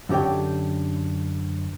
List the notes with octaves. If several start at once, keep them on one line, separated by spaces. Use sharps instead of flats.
F#2 D3 G4 C#5 G5